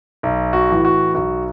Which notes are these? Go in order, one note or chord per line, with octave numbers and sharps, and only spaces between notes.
B1
F#4
A2 E3
F#4
B1 F#4